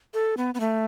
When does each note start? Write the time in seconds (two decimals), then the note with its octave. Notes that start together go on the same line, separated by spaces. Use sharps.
0.14 A4
0.37 B3
0.54 B3
0.60 A3